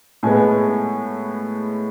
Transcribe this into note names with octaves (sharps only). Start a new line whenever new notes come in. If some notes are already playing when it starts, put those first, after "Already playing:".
A2 G#3 B3 G#5